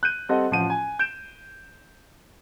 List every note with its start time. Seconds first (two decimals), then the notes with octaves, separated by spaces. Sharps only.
0.03 F#6 G6 D#7
0.29 G3 C4 A4 D#5 F#5
0.51 A1 F3 F#5 D#7
0.70 G#5
0.99 G6 D7 E7